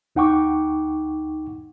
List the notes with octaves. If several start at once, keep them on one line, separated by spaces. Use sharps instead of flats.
D2 D#4 F#5 G5 C#6 D6